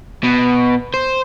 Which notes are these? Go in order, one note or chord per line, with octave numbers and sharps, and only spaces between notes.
B2
C5